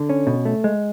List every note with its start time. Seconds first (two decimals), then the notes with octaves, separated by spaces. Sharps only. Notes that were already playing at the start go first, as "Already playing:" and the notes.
Already playing: D3
0.09 C#4
0.27 B2
0.45 A3
0.64 G#3